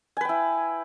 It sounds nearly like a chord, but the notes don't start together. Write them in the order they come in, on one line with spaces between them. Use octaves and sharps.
G#5 B4 G5 E4